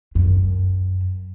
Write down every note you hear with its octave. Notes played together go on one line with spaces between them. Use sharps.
F#2